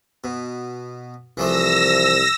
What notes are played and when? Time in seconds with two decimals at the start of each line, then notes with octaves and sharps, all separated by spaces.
0.24 B2
1.37 C2 E3 F3 A3 E6 A#6